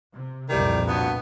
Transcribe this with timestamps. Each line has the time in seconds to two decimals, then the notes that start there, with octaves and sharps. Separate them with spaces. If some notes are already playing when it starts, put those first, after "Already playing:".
0.13 C3
0.50 C2 F2 A#2 D#3 E3 G3
0.88 G2 B2 B3